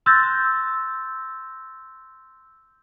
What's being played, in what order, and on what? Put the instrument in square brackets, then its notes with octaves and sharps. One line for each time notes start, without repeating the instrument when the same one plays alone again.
[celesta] C6 E6 F#6 G6 A6 A#6